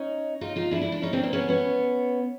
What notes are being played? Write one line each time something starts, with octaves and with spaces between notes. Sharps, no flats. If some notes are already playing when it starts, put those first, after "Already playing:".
Already playing: C#4 D#4
D#4 F4
D#4 F4
D4 E4
D4 E4
D4 E4
C#4 D#4
C4 D4
A#3 C4
B3 C#4
B3 C#4